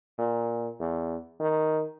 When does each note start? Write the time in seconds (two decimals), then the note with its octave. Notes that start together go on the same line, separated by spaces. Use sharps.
0.18 A#2
0.80 E2
1.40 D#3